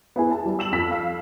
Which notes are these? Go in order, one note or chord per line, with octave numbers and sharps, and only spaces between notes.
B3 E4 G#4
A5
G3
E6 E7 F#7
F2 B6
F5